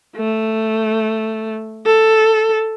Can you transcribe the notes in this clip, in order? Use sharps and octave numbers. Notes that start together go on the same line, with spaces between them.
A3
A4